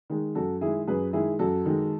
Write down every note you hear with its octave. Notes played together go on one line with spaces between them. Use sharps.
D#3 G#3
F#2 F#4 A4
D#3 G#3 E4 G#4
F#2 G#4 B4
D#3 G#3 E4 G#4
F#2 F#4 A4
D#3 G#3